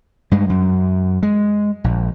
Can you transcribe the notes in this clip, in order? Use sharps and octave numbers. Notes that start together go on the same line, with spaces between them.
G2 G#3
F#2
G#3
A#1